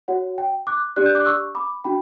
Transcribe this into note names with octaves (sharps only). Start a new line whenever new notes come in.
F#4 C#5 F#5
G5
D6 F#6
D4 G4 D5 F#6
G6
D6 F#6
C#6 E6
B5 D6
D4 F#4 G5 B5